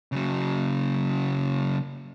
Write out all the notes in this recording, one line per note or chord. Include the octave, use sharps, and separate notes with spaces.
C#3 F#3